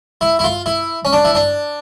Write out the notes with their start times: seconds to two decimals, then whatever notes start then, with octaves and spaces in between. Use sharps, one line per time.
0.21 E4
0.39 E4
0.44 F4
0.66 E4
1.05 C#4
1.13 D4
1.25 E4
1.35 D4